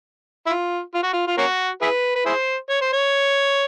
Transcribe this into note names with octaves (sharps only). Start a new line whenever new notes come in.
E4
F4
F4
F#4
F4
F4
A#3 C#4 F#4
E4 G#4 B4
B4
E4 G#4 C5
C#5
C5
C#5